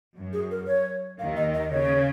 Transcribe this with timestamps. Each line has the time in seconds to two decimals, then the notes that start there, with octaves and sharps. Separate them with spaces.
0.17 F#2
0.33 G#4
0.51 A#4
0.67 C#5
1.19 D#2 D#3 F5
1.36 D#5
1.54 D#5
1.71 C#3 C#5